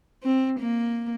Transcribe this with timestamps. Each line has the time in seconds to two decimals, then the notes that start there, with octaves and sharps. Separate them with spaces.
0.24 C4
0.60 A#3